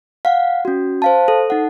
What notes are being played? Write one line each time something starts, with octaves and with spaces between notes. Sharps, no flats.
F5 F#5
C#4 F#4
C5 F5 A5
A4
D#4 F#5